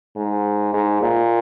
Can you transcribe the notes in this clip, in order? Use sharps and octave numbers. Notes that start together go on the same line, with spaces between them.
G#2
G#2
A#2